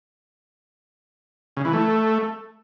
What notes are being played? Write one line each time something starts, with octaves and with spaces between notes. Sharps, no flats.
C#3
E3
A3